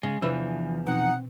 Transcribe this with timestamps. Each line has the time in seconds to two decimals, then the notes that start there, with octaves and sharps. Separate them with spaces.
0.03 C#3 G#3
0.22 E2 C3 E3 F3 D4 B4
0.87 B2 C4 D#4 F#5